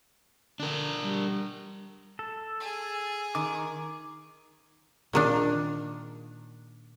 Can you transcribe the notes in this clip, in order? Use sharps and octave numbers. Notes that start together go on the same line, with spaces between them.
D3 D4 A#4
G3
A4
G#4
D#3 D6
A#2 D#3 D4